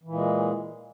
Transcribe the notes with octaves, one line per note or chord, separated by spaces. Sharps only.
A#2 E3 G#3